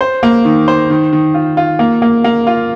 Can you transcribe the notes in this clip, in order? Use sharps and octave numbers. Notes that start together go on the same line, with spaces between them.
C5
A#3
D#3
C5
D#3
D#3
F4
F4
A#3
A#3
A#3
F4